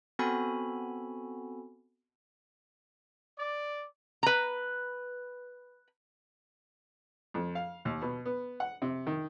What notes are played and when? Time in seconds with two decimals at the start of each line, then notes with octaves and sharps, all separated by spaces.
0.19 B3 C4 F#4 A4 G#5 B5
3.39 D5
4.23 B4 A#5
7.34 F2
7.55 F5
7.85 D#2
8.02 B2
8.25 B3
8.60 F#5
8.82 C3
9.07 D#3